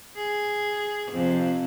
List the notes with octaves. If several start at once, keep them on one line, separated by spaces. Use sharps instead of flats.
G#4
F2 C3